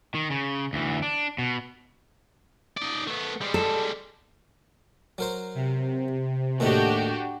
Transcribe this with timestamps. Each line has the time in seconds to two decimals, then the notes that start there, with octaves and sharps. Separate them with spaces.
0.15 D#3
0.30 C#3
0.73 D2 E3
1.02 D4
1.38 B2
2.77 D#4 D5
3.07 A3 B3
3.41 G3 G#3
3.54 A4
5.18 F#3 A#4 C5
5.55 C3
6.60 D#2 A2 D4 D#4 F#4 G4